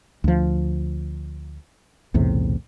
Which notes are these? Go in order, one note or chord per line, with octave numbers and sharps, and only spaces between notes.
D2 F3
B1 E2 A2 C3